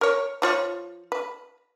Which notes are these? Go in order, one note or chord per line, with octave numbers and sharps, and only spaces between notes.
A#4 C#5
F3 F4 C#5
B4